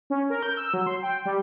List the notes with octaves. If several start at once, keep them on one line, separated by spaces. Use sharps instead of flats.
C#4
A#4
G6
E6
F#3
C6
G5
G3